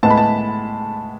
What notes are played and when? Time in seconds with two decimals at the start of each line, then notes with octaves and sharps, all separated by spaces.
0.03 A2 G#3 B3 A5
0.10 B5
0.17 A5